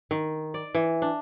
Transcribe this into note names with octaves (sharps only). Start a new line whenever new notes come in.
D#3
D5
E3
D4